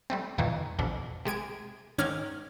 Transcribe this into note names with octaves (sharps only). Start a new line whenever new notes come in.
G3 A3 C4
F2 A#2 D#3 E3
A1 F2 B2 D4
C3 G#3 G#6 D7
G#2 D#3 C#4 D6 F6 G#6